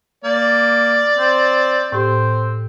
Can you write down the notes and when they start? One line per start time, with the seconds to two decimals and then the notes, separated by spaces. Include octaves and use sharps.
0.24 A#3 D5
1.18 C4
1.92 A2 C4 G4